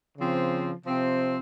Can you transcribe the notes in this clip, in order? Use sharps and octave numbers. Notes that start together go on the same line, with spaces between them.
C#3 F3 C4
C3 F3 C4